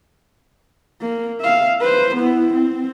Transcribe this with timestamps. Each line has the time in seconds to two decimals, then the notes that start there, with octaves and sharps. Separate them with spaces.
1.01 A#3
1.41 E5 F5
1.81 B4 C5
2.17 B3 E4
2.54 C4